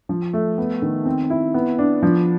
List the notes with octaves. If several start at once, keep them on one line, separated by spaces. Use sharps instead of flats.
F3
A3
B3
D#3
C4
E4
B3
D4
F3